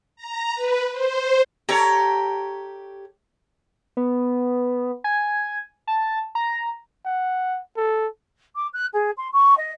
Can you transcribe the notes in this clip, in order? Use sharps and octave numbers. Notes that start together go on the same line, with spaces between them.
A#5
B4
C5
G4 A4 C#5 A#5
B3
G#5
A5
A#5
F#5
A4
D6
F#6
G#4
C6
C#6
D#5